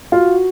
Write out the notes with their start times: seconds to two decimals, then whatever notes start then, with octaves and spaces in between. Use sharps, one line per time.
0.12 F4 F#4